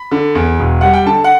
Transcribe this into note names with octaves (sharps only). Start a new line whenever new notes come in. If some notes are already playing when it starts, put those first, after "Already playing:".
Already playing: B5
D3
E2
E1
G3 F#5
G5
D3 A5
F#5